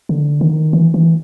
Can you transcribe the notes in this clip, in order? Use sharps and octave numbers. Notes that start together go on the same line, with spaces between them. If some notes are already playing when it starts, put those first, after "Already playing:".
D3
D#3
E3
E3